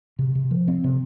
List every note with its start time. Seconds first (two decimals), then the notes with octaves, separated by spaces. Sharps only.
0.19 C3
0.35 C3
0.51 F3
0.68 C4
0.84 C3